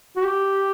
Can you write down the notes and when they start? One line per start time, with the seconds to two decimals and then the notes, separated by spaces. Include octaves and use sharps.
0.16 F#4
0.23 G4